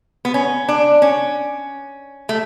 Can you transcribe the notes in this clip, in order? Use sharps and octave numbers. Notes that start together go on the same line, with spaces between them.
B3
C#4
D4
C#4
A3